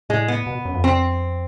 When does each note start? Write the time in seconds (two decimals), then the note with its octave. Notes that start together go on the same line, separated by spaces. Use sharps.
0.09 A2 G#3
0.28 B3
0.47 B2
0.65 F#2
0.74 F2
0.84 C4